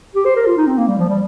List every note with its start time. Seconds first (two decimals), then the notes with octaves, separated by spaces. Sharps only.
0.15 G4
0.25 C5
0.36 A#4
0.46 F4
0.57 D#4
0.67 C4
0.78 A#3
0.88 G3
0.98 F3
1.09 G3